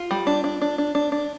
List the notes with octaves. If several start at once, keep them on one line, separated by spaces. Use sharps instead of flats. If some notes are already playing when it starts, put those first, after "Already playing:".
Already playing: F4
G3
D4
D4
D4
D4
D4
D4